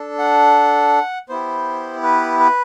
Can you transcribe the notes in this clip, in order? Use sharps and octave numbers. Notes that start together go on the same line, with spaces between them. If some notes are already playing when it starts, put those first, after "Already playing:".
Already playing: D4 A4
F#5
B3 E4 G4 C5
B4
B4